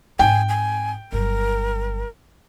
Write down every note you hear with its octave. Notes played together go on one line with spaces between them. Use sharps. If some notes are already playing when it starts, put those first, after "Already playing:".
G#2 C4 G5 G#5
G#5
G1 F#3 A#4